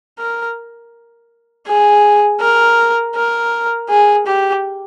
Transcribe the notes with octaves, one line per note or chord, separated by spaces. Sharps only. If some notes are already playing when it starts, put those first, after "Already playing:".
A#4
G#4
A#4
A#4
G#4
G4